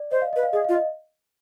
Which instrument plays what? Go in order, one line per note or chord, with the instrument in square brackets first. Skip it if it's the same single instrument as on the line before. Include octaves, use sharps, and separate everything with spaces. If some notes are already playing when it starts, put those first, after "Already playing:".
Already playing: [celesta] D5
[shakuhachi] C5 [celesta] D#5
[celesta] F5
[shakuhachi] B4 [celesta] D#5
[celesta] F5
[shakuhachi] G#4 [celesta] D#5
[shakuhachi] F4 [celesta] F5
[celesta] D#5